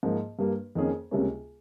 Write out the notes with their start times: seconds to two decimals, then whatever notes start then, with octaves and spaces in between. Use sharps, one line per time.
0.03 G#2 F3 A#3
0.39 G2 G3 A#3
0.75 F2 D#3 A#3 C#4 G#4
1.11 C#2 C3 G3 A#3 C#4